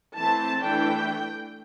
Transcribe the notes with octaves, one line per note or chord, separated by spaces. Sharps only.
E3 A3 C4 A5
E3 A3 D4 G5